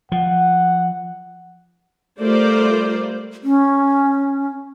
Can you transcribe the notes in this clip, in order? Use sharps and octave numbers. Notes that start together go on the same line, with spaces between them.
F3 F#5
G3 A3 F4 A#4 C5 D5
C#4